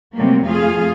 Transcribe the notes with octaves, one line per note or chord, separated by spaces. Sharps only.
C3 F#3 G3 A3 A#3
F2 A3 F4 G#4 F5